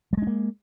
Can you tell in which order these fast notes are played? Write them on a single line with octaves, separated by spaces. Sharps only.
G3 G#3 D4 A#3